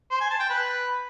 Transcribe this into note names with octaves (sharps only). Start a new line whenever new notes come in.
C5
G#5
A5
G5
B4